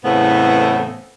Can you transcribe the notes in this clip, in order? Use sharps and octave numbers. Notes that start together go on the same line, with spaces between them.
E2 A2 C#3 A3 B3 C4